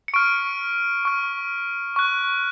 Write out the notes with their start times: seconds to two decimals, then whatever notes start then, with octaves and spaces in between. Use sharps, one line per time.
0.08 C#7
0.14 C#6 F6 D7
1.05 C#6 F6
1.96 C#6 F#6